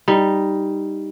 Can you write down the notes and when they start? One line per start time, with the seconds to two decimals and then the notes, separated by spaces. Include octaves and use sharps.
0.08 G3 D#4